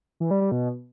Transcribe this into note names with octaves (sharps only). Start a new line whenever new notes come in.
E3
G3
G3
B2